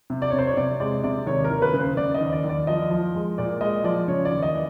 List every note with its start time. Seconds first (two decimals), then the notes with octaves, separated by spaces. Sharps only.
0.10 C3
0.22 D5
0.30 C3 C#5
0.38 C5
0.47 C#5
0.57 C3 D5
0.80 G#3 D5
1.04 C3 D5
1.27 D#2 C#5
1.44 A#4
1.50 D#2
1.62 B4
1.73 C#3
1.80 C5
1.97 C#3 D5
2.14 D#5
2.21 D#2
2.32 D5
2.44 D#2
2.49 D5
2.67 F3 D#5
2.90 F3
3.15 G#3
3.38 A#2 D5
3.61 G#3 D#5
3.84 F3 D5
4.08 C#3 C#5
4.25 D5
4.31 D#2
4.43 D#5
4.54 E3